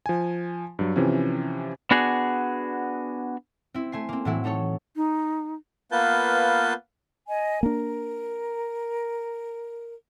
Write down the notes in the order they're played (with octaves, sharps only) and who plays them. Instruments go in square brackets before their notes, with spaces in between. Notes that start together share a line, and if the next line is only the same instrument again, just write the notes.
[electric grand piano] F3 G#5
G2 F#3
C3 E3 F3 C#4
[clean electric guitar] B3 D4 F#4 G#4
[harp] C4 E4
A3 G#5 C6
A#3 C4
A2 E3 F#3 E4
A3 D#4 A4 C#5
[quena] D#4
[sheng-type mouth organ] A#3 B3 F4 B4 A5 G6
[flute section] D#5 G#5
[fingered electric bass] A#3 D4 [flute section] A#4